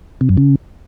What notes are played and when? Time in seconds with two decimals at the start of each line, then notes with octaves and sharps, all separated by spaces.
0.21 C3
0.29 F#2
0.37 C#3